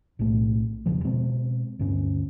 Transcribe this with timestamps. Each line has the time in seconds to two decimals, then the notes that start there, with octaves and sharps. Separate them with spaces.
0.19 B1 A2 A3
0.86 E1 E2 C#3 F3
1.04 B2 G#3 C4
1.79 D2 G2 C#4